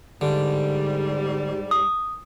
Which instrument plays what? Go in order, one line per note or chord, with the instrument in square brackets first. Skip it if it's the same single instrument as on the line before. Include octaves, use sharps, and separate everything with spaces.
[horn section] G#2 G3 [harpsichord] D3
[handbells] D#6